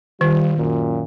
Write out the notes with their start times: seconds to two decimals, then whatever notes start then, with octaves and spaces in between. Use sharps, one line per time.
0.21 D#3 G3 F4
0.57 F#2 A#2